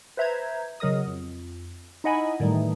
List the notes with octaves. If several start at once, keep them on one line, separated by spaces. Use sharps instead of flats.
B4 C5 E5 A#5 G6 G#6
C#3 F#3 A#4 D#5 D#6
F2
D#4 E4 D#5 F#5 G#5 B5
A2 D#3 E3 G3 A3 D#4